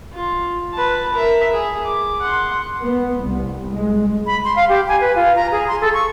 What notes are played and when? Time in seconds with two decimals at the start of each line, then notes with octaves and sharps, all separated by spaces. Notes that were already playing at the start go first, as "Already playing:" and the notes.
0.13 F4
0.73 B4 A5
1.13 A#4 E5
1.52 G#4
1.85 D6
2.21 F#5 C6
2.84 B3
3.22 C2
3.73 G#3
4.26 B5
4.44 C6
4.56 F5
4.69 G4
4.88 G#5
5.01 B4
5.16 F4
5.36 A#5
5.52 G#4
5.68 C6
5.81 A4
5.94 C#6